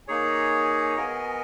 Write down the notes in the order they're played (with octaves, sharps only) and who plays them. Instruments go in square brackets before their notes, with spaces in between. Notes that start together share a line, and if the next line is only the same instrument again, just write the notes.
[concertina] A#3 D#4 G#4 C#5 [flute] G#5
[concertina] B3 F#4 A#4 D#5